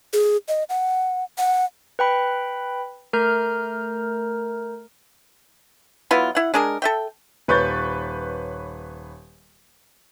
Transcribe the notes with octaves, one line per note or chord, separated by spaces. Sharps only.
G#4
D#5
F#5
F#5
B4 G5 B5
A3 A#4 A#5 F6 G6
F#3 B3 E4 F4
E4 F#5
G#3 D4 G#4 A#4
A4 E5 G5
D#1 B4 C#5 C#6 G6 A6